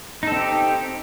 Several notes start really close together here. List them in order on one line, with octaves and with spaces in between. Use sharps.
D#4 A4 C4 G4